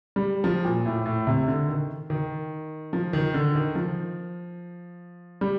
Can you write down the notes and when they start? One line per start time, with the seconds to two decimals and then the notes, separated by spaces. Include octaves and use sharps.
0.16 G3
0.44 F3
0.65 A#2
0.86 A2
1.06 A2
1.27 C3
1.47 D3
1.68 D#3
2.10 D#3
2.93 F3
3.13 D#3
3.34 D3
3.55 D#3
3.75 F3
5.41 G3